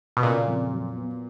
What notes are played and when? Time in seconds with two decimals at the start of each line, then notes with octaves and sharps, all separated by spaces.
0.17 B2
0.23 A#2 C#3
0.47 F2
0.71 F#3
0.95 B3